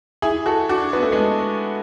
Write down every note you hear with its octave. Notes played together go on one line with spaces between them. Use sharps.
E4 G#4
F#4 A4
D4 F#4
B3
A3
G#3 B3